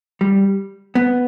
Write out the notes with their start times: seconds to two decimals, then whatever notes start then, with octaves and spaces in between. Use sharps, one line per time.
0.21 G3
0.95 B3